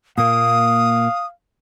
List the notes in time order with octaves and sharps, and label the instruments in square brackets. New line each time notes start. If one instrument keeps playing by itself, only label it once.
[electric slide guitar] A#2 A#3 [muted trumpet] F5 [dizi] D#6